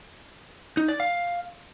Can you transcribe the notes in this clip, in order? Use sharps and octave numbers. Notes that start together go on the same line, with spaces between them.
D#4
D5
F5